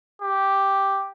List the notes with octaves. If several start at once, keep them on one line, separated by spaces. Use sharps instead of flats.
G4